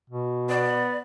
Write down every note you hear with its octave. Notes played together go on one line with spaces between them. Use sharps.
B2
B3 D5